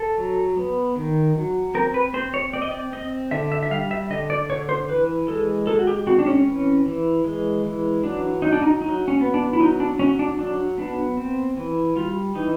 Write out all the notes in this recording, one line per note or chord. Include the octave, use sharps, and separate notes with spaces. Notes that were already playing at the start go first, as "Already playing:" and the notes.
Already playing: A4
F#3
B3
D#3
F#3
C4 A#4
B4
C4 C5
C#5
C4 D5
D#5
D5
C4 D#5
D3 E5
E5
E5
G3 F5
E5
D3 D#5
D5
D3 C#5
C5
E3 B4
G#3 A4
G#3 A4
F#4
G4
C4 F#4
D4
C#4
E3
E3
G#3
E3
F#3 D4
F#3 D#4
D4
D#4
F#3 D#4
C#4
B3
D4
E4
F#3 D#4
D4
F#3 C#4
D4
F#3 D4
B3 D4
C4
E3
G3 F4
E3 D#4